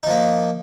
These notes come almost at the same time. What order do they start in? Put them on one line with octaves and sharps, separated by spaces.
D#4 F3 A#3